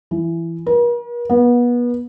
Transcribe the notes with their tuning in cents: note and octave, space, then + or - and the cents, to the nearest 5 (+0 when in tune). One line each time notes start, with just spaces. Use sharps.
E3 +15
A#4 +45
B3 -30